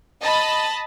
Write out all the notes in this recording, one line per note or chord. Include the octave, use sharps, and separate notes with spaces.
D#5 A5 B5